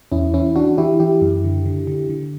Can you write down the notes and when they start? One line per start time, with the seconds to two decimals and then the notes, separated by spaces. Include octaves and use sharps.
0.12 E2 C#4 E4
0.34 E3 C#4 E4
0.56 E3 D4 F#4
0.78 E3 E4 G4
1.00 E3 E4 G4
1.22 F#2
1.44 D3
1.65 D3
1.87 D3
2.10 D3